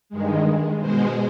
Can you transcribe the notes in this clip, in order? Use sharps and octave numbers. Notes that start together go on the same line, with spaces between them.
G2 D#3 G#3
B2 G#3 C5